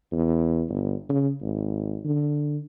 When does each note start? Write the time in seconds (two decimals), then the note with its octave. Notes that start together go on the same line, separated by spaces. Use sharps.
0.12 E2
0.69 G1
1.09 C#3
1.41 G#1
2.05 D3